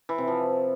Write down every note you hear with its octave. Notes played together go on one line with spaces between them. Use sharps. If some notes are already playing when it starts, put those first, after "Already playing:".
E3
C3
F3